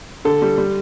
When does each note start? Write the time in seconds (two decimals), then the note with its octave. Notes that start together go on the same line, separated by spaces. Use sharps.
0.25 D3 A4
0.42 G3
0.58 G3